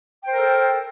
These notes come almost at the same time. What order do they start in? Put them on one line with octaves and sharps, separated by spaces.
G5 C5 A#4 A4